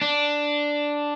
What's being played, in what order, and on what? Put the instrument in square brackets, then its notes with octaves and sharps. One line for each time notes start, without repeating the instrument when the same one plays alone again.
[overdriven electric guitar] D4